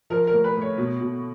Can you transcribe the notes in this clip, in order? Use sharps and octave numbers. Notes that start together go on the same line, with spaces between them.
F3 A#4
A#4
A2
B4
A2
C#5
B2
B2